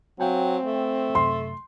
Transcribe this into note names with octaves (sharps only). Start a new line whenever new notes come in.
F#3 C4 F5 G5 G#5
A3
F#2 C3 C6